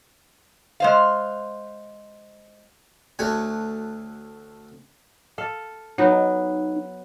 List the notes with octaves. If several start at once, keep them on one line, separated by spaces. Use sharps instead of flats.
G#3 C5 F5
D2 A3 F#4 C#5
A4 F5
F#3 B3 D#4